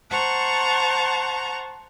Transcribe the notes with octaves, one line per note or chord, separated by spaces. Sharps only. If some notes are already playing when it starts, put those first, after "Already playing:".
C5 F#5 A5 A#5 C#6